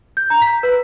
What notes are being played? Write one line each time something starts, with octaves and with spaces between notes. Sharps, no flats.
G6
A#5
B6
B4